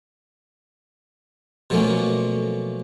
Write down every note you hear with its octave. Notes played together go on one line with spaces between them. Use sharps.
B2 F3 F#3 A3 A#3 C#4